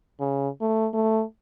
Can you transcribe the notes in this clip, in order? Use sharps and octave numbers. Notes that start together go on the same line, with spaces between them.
C#3
A3
A3